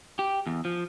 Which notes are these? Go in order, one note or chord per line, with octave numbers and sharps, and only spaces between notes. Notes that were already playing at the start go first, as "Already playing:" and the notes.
G4
E2
F3